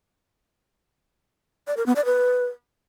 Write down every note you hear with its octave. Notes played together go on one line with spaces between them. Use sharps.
D5
A#4
B3
D5
B4